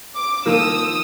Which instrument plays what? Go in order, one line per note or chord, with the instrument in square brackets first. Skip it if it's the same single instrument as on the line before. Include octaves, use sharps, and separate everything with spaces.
[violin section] D6
[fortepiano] D#3 F3 A#3 [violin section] D#6 E6